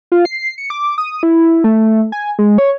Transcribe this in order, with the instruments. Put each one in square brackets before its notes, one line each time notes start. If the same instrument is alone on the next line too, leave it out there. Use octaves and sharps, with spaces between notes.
[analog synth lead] F4
C7
C#7
D6
D#6
E4
A3
G#5
G#3
C#5